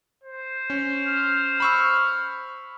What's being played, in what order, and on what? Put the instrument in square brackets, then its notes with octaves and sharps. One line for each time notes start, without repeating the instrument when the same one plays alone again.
[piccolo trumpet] C5
[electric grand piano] C#4
[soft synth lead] F6
[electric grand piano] B5 C#6 E6